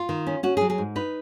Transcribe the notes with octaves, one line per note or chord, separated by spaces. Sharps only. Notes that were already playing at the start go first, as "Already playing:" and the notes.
Already playing: F4
D#3
C#4
C#4 F#4
G#4
F#3
G#4
G#2
D#4 B4